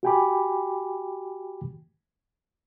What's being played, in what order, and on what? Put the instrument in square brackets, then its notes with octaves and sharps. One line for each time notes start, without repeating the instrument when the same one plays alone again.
[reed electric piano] F#4 G4 G5 G#5 B5 D6